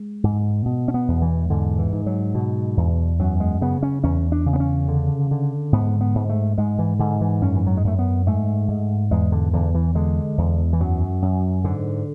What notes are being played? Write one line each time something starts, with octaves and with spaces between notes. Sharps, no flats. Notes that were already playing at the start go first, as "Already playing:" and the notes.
Already playing: G#3
G#2
B2
C#4
B3
E2
E3
G#2 D3
E3
G#2
F#3
B2
E2
F#2 F#3
G#3
C#3 B3
C#4
E2 C#4
D4
C#3
B3
C#4
D3
D3
G#2 B3
B3
G#2
A3
G#2 G#3
E3
G#2 D3
E3
F#2 C#4
E3
F#3
G#3
F#2 A3
B3
G#2 A3
G#2
E2 G#3
D3
E2 D3
E3
D3 G#3
E2
E3
F#2 F#3
F#2
G#2 D3